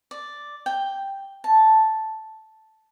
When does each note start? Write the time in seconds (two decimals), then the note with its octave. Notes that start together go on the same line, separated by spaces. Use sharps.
0.11 D5
0.66 G5
1.44 A5